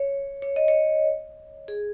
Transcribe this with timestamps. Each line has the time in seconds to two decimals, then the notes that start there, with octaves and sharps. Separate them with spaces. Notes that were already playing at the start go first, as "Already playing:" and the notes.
Already playing: C#5
0.42 C#5
0.56 D#5
0.68 C#5
1.68 G#4